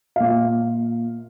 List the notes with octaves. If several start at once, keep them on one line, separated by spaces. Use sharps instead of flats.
A#2 F5